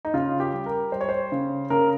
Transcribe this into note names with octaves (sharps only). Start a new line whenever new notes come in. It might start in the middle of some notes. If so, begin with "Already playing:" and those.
D#4
C#3 F4
G4
G3
A#4
G3 C5
C#5
C5
C#3
C#3 A#4